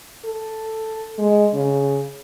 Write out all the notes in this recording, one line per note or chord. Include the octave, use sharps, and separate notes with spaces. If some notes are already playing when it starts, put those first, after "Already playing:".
A4
G#3
C#3